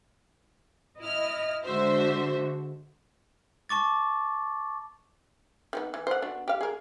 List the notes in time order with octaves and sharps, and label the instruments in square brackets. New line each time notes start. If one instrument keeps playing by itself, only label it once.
[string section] E4 F6 [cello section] D#5
[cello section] D3 G#3 F#4 [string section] C5 E5
[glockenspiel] A5 C#6 D6 A6
[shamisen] D#3 A3 B3
E3
C5 F#5
B3 D4 F#4
G4 F5
G#4 A#4